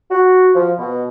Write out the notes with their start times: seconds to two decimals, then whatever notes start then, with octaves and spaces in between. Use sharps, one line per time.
0.11 F#4
0.55 F3
0.79 B2